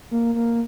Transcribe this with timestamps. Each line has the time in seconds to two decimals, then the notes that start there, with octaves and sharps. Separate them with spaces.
0.11 A#3
0.35 A#3